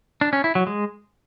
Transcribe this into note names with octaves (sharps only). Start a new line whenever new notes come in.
D4
C#4
E4
F#3
G#3